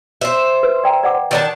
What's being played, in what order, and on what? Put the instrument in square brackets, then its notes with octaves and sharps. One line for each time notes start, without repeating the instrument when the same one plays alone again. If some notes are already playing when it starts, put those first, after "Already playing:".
[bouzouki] C5 E5
[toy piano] B4
D5 G5 A#5
D5 F#5 D6
[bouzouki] D#3 D4 A5